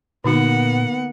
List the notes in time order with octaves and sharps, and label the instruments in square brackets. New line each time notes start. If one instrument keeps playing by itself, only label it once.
[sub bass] A#2 [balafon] D3 D#4 F#4 [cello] A#3 F#5 [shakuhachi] B3